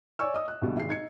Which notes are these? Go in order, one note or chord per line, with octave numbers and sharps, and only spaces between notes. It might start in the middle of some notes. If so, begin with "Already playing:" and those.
C#5 D5 G#5 C#6 E6
D#5 D#6
F#6
A#1 G2 B2 D3
G#1 G#3 C7
D#4 G#6 C#7